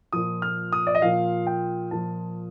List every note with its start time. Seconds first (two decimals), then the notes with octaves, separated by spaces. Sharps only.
0.13 A#2 F3 D#6
0.42 F6
0.72 D#6
0.87 D5
0.95 D#5
1.02 A#2 F3 F5
1.47 G5
1.91 A#2 F3 A5